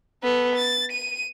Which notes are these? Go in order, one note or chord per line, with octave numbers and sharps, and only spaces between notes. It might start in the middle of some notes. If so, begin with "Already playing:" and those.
B3 A4
A6
D#7